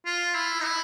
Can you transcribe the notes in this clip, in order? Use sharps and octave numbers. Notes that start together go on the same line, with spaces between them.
F4
E4
D#4
E4